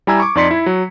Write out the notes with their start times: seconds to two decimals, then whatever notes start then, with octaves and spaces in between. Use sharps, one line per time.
0.07 G3 E4 G#5 A#5 E6 G#6
0.20 C#6 D6
0.35 F2 D#4 D5 C6 B6 C#7
0.51 E4
0.66 F#3